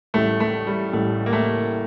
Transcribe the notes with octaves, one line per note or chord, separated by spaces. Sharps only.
A1 A2 G3 A3
A3
G3
A1 A2 G3 A3
A#3
A3